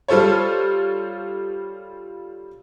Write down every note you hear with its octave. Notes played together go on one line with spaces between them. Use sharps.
G3 F4 A4 C5 C#5